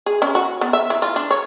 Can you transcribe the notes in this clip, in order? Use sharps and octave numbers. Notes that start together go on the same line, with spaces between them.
G#4
C#4
F#4
B3
E5
E3
F4
D4
C#5